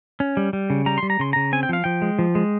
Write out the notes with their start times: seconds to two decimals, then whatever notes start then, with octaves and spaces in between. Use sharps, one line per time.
0.20 C#4
0.37 G3
0.53 G3
0.70 C#3
0.86 G3 A#5
0.98 G3 C6
1.10 A#5
1.19 C#3 C6
1.33 C#3 A#5
1.52 C4 G#5
1.63 G5
1.69 F3 F5
1.84 F3 G5
2.02 G#3
2.19 F3
2.35 G#3